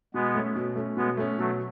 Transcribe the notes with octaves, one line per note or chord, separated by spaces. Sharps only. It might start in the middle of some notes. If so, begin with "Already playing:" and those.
B2 G#3 B3
A3 C#4
B2
A3 C#4
B2 G#3 B3
A3 C#4
B2 F#3 A3